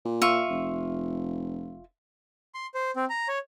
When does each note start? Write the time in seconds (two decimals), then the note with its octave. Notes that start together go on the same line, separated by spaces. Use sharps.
0.05 A#2
0.22 F4 E5 C#6
0.49 F1
2.55 C6
2.74 C5
2.96 C4
3.10 A#5
3.28 C#5